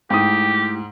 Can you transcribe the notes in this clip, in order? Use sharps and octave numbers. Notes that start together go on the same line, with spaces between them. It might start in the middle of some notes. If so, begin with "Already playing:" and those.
G#2 A3 E4 G4 G5 D#6